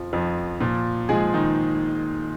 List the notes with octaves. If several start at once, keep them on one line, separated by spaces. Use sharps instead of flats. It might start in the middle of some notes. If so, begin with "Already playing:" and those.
Already playing: F2 F3
F2 F3
A#2 F3
A#2 F3 G#3 G#4
D#3 D#4